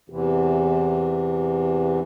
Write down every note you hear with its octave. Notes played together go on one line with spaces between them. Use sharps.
E2 C3 E3